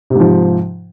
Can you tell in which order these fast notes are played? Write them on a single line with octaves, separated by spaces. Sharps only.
C3 G#2 F3